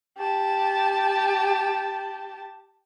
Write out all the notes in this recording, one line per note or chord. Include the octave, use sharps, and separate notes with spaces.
G4 A5